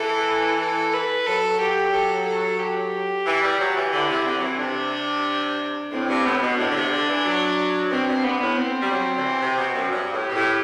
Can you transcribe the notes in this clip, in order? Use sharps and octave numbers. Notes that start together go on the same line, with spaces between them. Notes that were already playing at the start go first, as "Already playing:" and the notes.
Already playing: E3 A4
A4
B4
F#3 A4
G4
A4
A4
G4
E3
G3
F#3
E3
D3 E4
C3
D3 C4
F#3
E3
C3 D4
A2 C4
G2
A2 B3
B2
A2 D4
D3
C3
D3
E3
F#3
B2 C4
G2
G2 B3
A2
C4
G3
F#3
D3
E3
C3
B2
F#2
G2
A2
G4
B2
A2